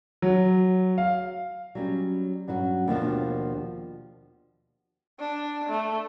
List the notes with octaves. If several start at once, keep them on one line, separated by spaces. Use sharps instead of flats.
F#3
F5
F#3 G3 C#4
G2 F#3 C#4 F#4
D#2 B2 F3 D4
D4
A3